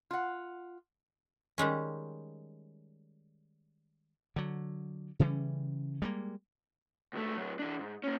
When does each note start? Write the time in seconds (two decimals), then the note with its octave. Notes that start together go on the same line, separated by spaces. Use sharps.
0.11 F4 F#5
1.58 D#3 G3 G#3 C#4
4.36 D3 F#3
5.19 C#3 E3 G3 C#4
6.02 G3 G#3 A#3
7.13 C#2 A3
7.37 A2 F#3
7.59 E3 D4
7.79 G#2
8.04 A#3 C#4